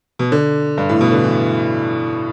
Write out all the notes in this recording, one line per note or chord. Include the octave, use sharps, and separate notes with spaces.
B2
D3
G2
A2
B2
D3
E3